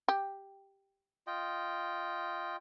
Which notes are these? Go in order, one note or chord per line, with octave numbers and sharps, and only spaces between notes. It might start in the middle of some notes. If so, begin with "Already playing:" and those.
G4
F4 D#5 G5